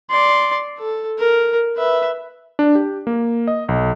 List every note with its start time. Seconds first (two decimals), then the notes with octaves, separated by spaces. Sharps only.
0.10 D5 C6
0.78 A4
1.18 A#4
1.76 B4 E5
2.59 D4
2.75 G4
3.07 A#3
3.48 D#5
3.69 B1